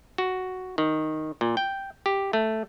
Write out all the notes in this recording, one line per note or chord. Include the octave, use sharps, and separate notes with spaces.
F#4
D#3
A#2
G5
G4
A3